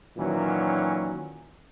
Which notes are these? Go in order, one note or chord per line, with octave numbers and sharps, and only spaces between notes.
A#2 D#3 E3 F#3 C#4